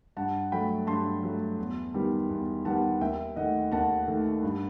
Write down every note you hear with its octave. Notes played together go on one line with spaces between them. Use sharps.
G2 F#5 A5
F#3 A3 G5 B5
G2 A5 C6
F#3 A3
E2
D#3 G3 B3
E2
D#3 G3 B3 F#5 A5
D#2 E5 G5
D#3 A3 D#5 F#5
D#2 F#5 A5
D#3 A3
G2